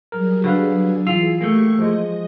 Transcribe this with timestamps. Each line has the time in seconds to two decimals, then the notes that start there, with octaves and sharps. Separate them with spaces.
0.12 F#3 G3 G#4 A#4
0.44 D3 F#4 B4 F5
1.07 E3 F4 G#4 E6 C7
1.41 A3 A#3 G4 C#6
1.79 F3 G#3 D#5